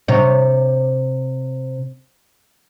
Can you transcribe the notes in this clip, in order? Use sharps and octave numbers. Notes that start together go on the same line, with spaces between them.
C3 C#5